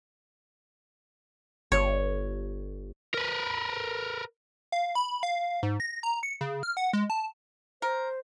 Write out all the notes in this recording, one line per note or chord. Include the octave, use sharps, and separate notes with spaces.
G1 C#5
A#4 B4
F5
B5
F5
G#2
A#6
A#5
C#7
C#3
F6
F#5
G#3
A5
A#4 C5